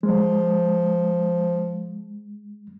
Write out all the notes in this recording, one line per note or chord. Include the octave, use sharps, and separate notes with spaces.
F3 G#3